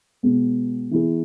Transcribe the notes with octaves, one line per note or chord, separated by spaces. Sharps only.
B2 G#3 B3
E3 B3 E4 G#4